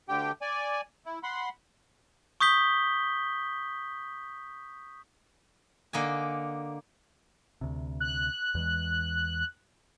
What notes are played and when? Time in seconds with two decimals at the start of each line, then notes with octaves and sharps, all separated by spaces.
0.09 D2 D3 G4 G5
0.41 D5 G#5
1.06 E4
1.23 F#5 B5 C6
2.40 C#6 D#6 G6 B6 G7
5.93 D3 A#3 D#5 G#5
7.61 D2 C3
8.00 F#6
8.55 E2 E3 G#3